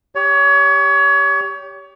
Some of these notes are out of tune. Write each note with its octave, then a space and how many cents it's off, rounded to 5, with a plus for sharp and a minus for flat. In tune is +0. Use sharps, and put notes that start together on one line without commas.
G4 +0 C#5 +30